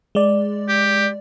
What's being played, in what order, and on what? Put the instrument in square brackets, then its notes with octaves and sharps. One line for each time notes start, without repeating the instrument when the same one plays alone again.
[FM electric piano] G#3 D5
[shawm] G4